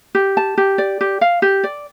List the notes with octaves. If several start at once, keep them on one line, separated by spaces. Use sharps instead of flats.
G4
A5
G4
D5
G4
F5
G4
D5